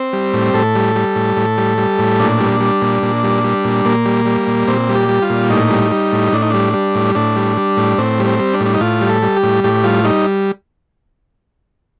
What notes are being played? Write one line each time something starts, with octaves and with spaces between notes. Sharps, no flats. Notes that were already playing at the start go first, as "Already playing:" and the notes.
Already playing: C4
G3
A2
A2 A4
G3
G3
A2
A2
G3
G3
A2
A#2 D4
G3
G3
A#2
A#2
G3
G3
A#2
A#2 A#3
G3
G3
A#2
A#2 C4
G3
G4
G3
F4
A#2
A2 D#4
G3
G3
A2
A2 D4
D#4
G3 D4
G3
A2
A2 D4
G3
G3
A2
A2 C4
G3
C4
G3
D4
A2
D4
D#4
A2 F4
G3
A4
G3
G4
A2
A2 G4
G3 F4
G3 D#4